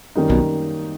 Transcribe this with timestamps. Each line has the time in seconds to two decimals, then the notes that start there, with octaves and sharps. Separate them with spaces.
0.16 F#2 D#3 G3 A#3 D#4
0.29 B1 B2